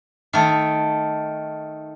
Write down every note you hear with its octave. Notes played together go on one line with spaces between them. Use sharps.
D#3 A3